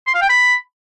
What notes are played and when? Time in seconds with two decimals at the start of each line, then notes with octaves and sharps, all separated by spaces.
0.07 C6
0.14 F5
0.22 G5
0.29 B5